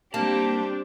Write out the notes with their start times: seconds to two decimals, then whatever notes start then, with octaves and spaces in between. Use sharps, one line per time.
0.14 G3 A#3 C4 D4 G4 A5